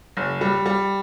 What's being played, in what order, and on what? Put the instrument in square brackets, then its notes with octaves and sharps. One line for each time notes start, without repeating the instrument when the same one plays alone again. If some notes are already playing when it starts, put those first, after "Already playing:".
[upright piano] F#1
G3
G3